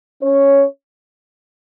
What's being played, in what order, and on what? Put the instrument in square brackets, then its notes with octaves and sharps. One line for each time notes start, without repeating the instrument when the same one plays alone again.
[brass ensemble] C#4 C#5